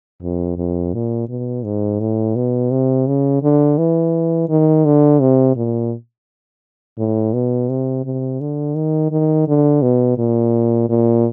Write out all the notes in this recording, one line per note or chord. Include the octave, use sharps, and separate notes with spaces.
F2
F2
A#2
B2
G#2
A2
B2
C3
C#3
D3
E3
D#3
D3
C3
A#2
A2
B2
C3
C3
D3
D#3
D#3
D3
B2
A#2
A#2